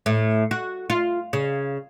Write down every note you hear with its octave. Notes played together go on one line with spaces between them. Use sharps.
A2
F#4
F4
C#3